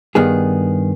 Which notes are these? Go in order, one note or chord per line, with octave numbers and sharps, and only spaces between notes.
G2 D#3 B3 G#4